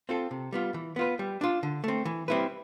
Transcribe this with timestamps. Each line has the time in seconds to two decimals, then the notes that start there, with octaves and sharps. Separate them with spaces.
0.09 C4 F4 A4
0.31 C3
0.53 G3 B3 F4
0.74 E3
0.96 B3 F4 B4
1.19 G3
1.41 D4 F4
1.63 D3
1.84 A3 C4
2.05 E3
2.28 G3 C4 E4 B4